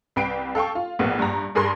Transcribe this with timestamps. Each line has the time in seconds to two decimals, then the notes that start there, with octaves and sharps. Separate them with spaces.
0.16 C2 B4 G5 C7 D7
0.55 A4 F5 G5 C#6
0.75 F4
0.99 A#1 A2 A#3 B3 F#5
1.19 G2 A#5
1.55 G2 G#4 A#4 B5 C6